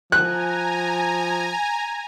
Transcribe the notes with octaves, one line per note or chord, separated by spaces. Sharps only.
F3 G#5 A#5 F#6